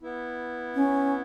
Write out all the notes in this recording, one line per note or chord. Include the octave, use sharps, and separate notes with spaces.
B3 E4
C#4